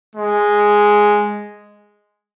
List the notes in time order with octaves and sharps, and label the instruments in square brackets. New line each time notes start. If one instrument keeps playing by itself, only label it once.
[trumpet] G#3